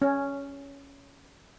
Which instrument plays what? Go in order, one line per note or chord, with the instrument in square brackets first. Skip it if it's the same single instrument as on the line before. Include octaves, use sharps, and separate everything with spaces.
[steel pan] C#4